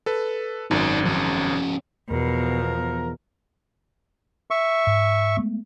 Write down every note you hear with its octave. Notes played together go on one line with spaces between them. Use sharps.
A4 B4
G#1 F#2 D#4 D5
F3 C#4
E2 B2 F3 A#4
E5 C#6
G#2
G#3 A3 B3